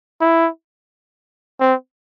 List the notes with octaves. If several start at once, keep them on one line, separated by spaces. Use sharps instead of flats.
E4
C4